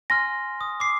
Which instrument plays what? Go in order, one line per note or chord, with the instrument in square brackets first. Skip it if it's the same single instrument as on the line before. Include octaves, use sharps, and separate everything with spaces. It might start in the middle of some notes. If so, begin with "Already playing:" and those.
[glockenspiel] G#5 C6 F6 [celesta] A#6
[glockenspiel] D#6
D6 C7